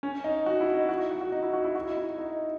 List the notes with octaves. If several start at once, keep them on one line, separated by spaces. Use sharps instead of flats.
C#4
D#4
F#4
E4
D#4
F#4
F#4
F#4
D#4
E4
F#4
E4
F#4
D#4
E4
D#4